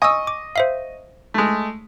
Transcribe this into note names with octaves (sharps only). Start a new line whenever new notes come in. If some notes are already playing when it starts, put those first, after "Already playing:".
D#5 G#5 C#6 D#6 E6
D6
C5 E5 F5
G#3 A3